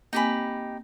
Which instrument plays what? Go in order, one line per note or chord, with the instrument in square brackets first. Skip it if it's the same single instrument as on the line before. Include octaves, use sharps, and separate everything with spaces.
[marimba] A#3 C4 G#5 [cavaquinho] D#4 G4 B5